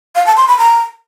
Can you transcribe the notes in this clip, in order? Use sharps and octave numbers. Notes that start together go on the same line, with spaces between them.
F5
A5
C6
B5
A#5